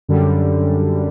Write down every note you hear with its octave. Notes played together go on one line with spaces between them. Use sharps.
F#2 D3 G3